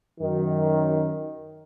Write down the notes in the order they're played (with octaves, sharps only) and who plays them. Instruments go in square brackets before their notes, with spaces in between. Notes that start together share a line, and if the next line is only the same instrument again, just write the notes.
[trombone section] F#2 D#3